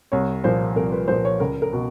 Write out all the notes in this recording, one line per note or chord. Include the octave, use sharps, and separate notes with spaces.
C2 C#5
A#2 F3 C5
C2 A#4
B4
A#2 F3 C5
C#5
C#2 A#4
A#4
B2